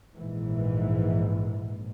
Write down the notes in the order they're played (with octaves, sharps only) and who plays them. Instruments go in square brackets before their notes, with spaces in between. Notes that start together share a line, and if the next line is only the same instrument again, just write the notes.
[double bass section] A#1 G#2 E3